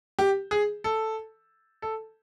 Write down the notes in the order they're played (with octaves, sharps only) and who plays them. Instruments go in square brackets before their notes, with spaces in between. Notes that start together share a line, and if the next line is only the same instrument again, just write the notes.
[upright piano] G4
G#4
A4
A4